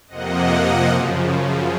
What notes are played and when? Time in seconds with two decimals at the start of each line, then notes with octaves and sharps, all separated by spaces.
0.08 F2 C3 F3 A#3 D#5 F#5
0.87 F#2 C#3 F3